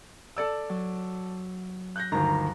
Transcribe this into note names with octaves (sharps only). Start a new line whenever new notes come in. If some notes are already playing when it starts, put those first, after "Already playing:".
A4 D5 E6
F#3
F#6 G6 A#6
G1 D2 D#3 A#5